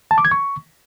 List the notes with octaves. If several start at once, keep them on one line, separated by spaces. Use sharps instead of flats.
A5
D6
G#6
C#6